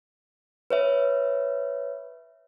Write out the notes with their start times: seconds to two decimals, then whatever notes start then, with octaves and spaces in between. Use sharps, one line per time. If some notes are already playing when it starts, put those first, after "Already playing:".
0.70 B4 C#5 E5